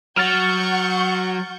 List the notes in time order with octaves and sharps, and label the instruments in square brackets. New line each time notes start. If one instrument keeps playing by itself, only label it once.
[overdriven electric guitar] F#3 [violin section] F#5 C#6 G6 [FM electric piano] F6 A6